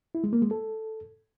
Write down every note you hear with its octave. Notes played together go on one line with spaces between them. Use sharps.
E4
G#3
A#3
G#3
A4